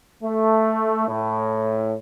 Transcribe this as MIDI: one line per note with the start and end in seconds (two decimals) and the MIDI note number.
0.23 1.06 57
1.08 1.95 45